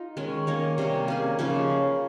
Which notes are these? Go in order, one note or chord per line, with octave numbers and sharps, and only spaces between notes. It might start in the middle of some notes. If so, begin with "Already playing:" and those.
Already playing: D#4 F4
D#3 G#3 C#4
A#3 D#4 A#4 C#5
C3 G3 A#3
A#3 C#4 G#4
C#3 F3 A#3 D#4